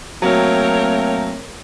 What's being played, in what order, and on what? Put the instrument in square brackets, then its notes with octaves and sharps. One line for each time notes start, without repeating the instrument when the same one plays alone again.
[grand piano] F#3 [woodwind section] A3 A#3 C4 [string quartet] A#4 C#5 G5